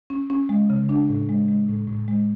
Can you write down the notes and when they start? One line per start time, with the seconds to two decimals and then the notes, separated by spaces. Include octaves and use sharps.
0.10 C#4
0.30 C#4
0.49 G#3
0.70 C#3
0.89 D4
1.09 A2
1.29 G#3
1.48 G#3
1.68 A2
1.88 A2
2.08 G#3